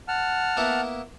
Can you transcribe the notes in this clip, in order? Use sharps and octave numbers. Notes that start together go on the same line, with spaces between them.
F#5 A5 F6
A#3 B3 E4